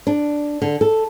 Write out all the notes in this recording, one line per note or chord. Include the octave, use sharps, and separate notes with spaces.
D4
D3
A4